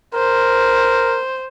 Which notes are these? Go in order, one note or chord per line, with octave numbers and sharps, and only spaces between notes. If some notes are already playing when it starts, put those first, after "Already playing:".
A#4 C5